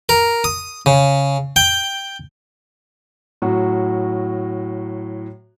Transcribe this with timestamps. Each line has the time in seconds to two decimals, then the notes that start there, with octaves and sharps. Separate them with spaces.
0.09 A#4
0.44 D#6
0.86 C#3
1.56 G5
3.42 A2 F#3 F#4